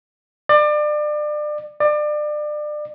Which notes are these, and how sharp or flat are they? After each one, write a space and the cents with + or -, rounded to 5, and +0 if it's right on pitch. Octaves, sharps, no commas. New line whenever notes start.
D5 +30
D5 +30